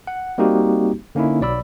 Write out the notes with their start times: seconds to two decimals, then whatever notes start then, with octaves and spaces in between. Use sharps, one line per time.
0.07 F#5
0.38 G3 A#3 C4 D#4 F#4 G4
1.15 D3 A#3 C#4 D#4 E4
1.41 B1 F#3 D5 B5 E6